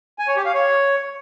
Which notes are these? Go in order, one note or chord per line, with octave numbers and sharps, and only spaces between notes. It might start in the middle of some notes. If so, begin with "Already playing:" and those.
G#5
C#5
G4
F5
C#5